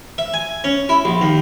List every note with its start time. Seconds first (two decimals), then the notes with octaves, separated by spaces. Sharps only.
0.18 E5
0.34 G#5
0.64 C#4
0.89 E4
1.05 A#1
1.21 D#2